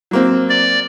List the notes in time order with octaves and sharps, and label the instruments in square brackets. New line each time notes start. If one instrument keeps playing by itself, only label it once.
[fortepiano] F#3 A#3 C4
[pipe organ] D5